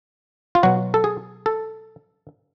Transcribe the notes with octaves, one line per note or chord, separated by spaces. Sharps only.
F4
B2 F#3 F#4
A4
G#4
A4